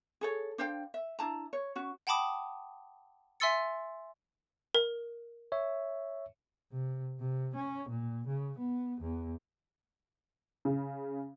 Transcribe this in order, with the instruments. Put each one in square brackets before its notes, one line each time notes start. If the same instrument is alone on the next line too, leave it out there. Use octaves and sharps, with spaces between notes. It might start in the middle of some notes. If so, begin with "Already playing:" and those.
[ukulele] G#4 A4 C#5
D4 C5 F5 G5
E5
D4 E4 A5 A#5
C#5
C#4 F#4
[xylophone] F#5 G5 A5 B5 D6 D#6
E5 G#5 C6 E6 A6 C#7
A#4
[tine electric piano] C#5 E5
[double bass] C3
C3
C#4
A#2
C#3
B3
E2
[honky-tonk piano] C#3